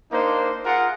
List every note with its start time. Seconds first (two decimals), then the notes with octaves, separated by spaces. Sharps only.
0.11 A#3 D4 D#4 C5
0.65 F4 G#4 A#4 F#5